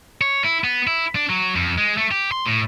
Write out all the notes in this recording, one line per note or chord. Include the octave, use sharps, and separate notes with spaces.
C#5
E4
B3
E4
D4
F#3
F2
G#3
A3
G4
C6
A2